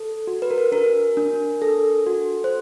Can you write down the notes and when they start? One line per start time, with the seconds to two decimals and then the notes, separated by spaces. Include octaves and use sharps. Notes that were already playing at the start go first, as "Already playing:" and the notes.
Already playing: A4
0.27 F#4
0.42 B4
0.51 A#4
0.58 B4
0.72 D4 A#4
1.17 D4
1.62 A4
2.07 F#4
2.44 C5